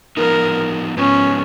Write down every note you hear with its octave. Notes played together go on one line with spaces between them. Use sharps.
F3 B3 D#4 A#4
G#2 F3 B3 C#4